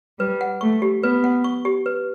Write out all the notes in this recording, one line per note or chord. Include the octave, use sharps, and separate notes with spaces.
G3 B4
F#5
A3 C#6
G4
B3 B4
F#5
C#6
G4
B4